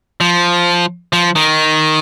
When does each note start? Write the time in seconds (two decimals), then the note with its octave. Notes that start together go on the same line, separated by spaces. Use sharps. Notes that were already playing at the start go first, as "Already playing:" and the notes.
0.21 F3
1.13 F3
1.36 D#3